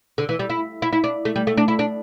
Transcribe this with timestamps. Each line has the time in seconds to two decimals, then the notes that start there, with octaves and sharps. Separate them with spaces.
0.18 D3
0.29 E3
0.39 G3
0.50 E4
0.82 E4
0.93 E4
1.04 D4
1.25 A3
1.36 G3
1.47 A3
1.57 D4
1.68 E4
1.79 D4